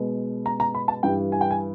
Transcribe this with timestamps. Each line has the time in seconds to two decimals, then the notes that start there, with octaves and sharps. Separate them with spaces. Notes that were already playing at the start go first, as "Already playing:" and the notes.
Already playing: B2 G#3 B3
0.46 A#5
0.60 A#5
0.75 B5
0.88 A5
1.03 G2 E3 G3 G5
1.32 G#5
1.41 G5
1.51 G#5